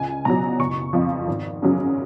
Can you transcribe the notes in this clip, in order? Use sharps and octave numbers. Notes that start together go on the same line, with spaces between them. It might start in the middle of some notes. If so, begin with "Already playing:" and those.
Already playing: C#2 G#5
B2 F#3 A#5
F#1 C#6
F2 F3
G#1
F#2 C#3 F#3